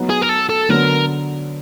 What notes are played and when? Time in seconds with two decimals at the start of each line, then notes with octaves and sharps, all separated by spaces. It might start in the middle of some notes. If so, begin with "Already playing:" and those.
Already playing: F#3 B3 D#4
0.10 G#4
0.22 A#4
0.29 A4
0.49 A4
0.69 D3 F#3 B3 A#4